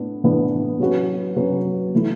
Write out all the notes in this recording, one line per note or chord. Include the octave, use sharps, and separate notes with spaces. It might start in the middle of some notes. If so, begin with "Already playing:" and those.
Already playing: A2 B3 D4
A2 E3 B3 D4
F#3 C#4 F#4 B4
F#3 C#4 F#4 B4
E3 A3 E4